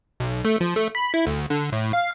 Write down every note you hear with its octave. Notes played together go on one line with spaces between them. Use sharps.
B1
A3
F3
A3
B5
E4
D2
D3
A2
F5